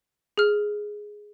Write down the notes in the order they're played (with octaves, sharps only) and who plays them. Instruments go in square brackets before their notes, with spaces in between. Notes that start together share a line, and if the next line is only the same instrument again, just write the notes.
[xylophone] G#4 F6